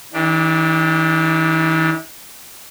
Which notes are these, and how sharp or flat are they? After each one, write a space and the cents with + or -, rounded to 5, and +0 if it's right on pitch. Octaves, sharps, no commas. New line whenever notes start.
E3 -40 D4 +5 G4 +10